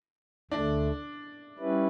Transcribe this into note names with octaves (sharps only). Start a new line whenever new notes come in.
D2 D3 A3 D4
G3 C#4 E4 B4